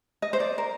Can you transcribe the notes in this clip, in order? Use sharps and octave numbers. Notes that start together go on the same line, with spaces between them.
D#5
C5
D5
A#4